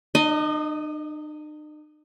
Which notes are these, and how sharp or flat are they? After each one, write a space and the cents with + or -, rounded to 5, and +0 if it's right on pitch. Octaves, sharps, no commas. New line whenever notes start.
D#4 -45 D#5 +5